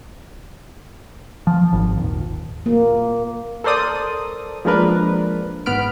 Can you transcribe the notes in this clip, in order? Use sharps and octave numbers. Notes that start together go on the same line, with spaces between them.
F3
G#1
D#1
A#3
A4 A#4 C5 D5 D#6
F3 G#3 A#3 D4 A#4 B4
G#1 B3 B5 F6 D7